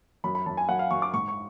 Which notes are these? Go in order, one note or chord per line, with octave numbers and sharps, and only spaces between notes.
F#2 B5
B5
F#2 A5
G#5
F#2 F#5
F5
F#2 C#6
D6
G#2 C#6
C#6